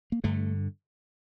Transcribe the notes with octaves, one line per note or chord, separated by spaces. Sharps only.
A#3
G2 D3 A3